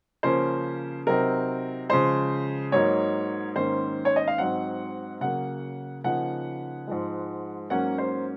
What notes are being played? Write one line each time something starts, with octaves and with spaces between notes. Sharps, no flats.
C#3 F3 A#3 C#4 C5
C3 F#3 C4 D#4 A#4
C#3 F3 G#3 C5
G#2 F#3 A#3 D#4 C#5
G#2 D#3 A#3 C#4 C5
C#5
D#5
F5
G#2 F#3 C4 D#4 F#5
C#3 F#3 A#3 F#5
C#3 F3 A#3 D#4 F#5
G#2 F3 G#3
G#2 F#3 A#3 C#4 F#5
C5